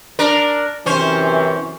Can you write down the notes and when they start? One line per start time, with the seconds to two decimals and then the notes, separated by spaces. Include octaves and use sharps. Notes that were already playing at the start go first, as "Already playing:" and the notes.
0.19 D4 A#4
0.86 F#2 C3 E3 C#4 C5